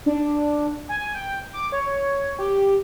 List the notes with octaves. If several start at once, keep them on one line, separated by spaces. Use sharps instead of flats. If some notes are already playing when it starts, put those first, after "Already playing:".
D4
G#5
G5
D6
C#5
G4